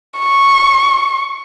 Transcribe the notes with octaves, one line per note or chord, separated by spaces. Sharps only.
C#6